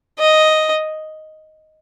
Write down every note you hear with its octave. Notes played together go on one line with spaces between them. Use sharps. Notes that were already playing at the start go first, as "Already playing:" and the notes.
D#5